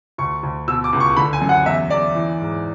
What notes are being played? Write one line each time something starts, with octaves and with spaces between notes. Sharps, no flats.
D2 C#6
D2
B2 E6
D6
C#2
C#6
D3 B5
G#5
F#2
F#5
E2 E5
E2 D5
E3
G#2